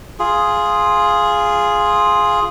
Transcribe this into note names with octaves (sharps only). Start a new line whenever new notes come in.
F4 G#4